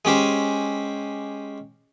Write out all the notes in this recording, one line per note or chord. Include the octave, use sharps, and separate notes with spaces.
G#3 C#4 G4 C5